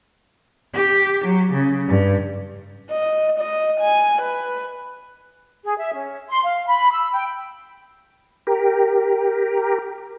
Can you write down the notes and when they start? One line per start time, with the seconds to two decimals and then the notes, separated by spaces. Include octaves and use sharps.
0.74 G4
1.24 F#3
1.53 C#3
1.88 G2
2.91 D#5
3.38 D#5
3.80 G#5
4.22 B4
5.65 G#4
5.78 E5
5.93 C#4
6.29 C6
6.43 F5
6.67 B5
6.92 E6
7.13 G5
8.47 G4 A#4